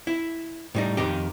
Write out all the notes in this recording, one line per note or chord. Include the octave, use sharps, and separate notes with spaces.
E4
A2 G3 D#4
F2 D#3 D#4 G4